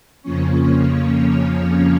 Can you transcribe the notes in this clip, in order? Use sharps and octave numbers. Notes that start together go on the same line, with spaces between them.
F2 C#3 F3 A#3 C#4 C#5